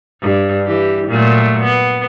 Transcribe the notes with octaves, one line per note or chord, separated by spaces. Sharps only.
G2
E3 G4
A#2 F#3 A3
B3